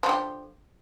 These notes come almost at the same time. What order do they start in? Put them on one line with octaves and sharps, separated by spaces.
F3 D3 G4